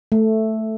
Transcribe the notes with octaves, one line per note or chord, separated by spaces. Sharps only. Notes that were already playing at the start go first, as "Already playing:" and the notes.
A3